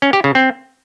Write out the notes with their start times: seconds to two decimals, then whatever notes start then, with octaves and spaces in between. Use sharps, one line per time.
0.02 C#4
0.13 G4
0.24 C#3
0.35 C4